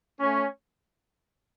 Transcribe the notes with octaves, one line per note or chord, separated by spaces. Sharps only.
A3 C#4